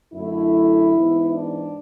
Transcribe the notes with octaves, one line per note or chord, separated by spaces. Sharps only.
F#2 D3 A3 E4
G#2 E3 B3
D4